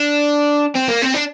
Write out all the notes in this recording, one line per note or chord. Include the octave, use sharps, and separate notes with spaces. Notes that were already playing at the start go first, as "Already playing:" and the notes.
Already playing: D4
C4
A#3
C4
D4